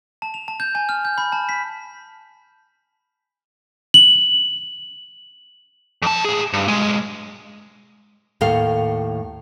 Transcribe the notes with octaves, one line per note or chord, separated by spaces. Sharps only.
A5
F7
A5
G6
G#5
F6
G6
B5
A5
B6
F#7
F2 A5
A2 G#4
G2
B1 G#3
D#2 A2 A4 F5